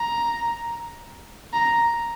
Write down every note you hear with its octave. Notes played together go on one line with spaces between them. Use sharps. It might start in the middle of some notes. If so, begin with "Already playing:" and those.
Already playing: A#5
A#5